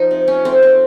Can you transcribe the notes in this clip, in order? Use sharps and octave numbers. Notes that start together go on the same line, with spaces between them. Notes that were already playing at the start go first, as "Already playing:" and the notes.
Already playing: F3 D#4
C3
C#4
A3 C4
C4